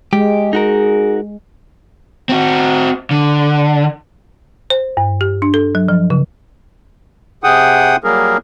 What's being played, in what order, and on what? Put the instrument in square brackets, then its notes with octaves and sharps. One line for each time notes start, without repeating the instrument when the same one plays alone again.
[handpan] G#3 [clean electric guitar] G4
[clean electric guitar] D#4 F#4 A#4 [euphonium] G#4
[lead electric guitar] C4 F#4
D3
[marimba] C5
G2
G4
D4
A4
F#3
F3
C#3
[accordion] C3 G#4 F#5 G5 D#6
F#3 G3 A#3 G#4 A#4